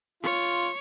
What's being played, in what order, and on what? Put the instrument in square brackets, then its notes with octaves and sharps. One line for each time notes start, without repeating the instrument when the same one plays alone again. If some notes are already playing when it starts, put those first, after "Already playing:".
[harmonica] F4 [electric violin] C#5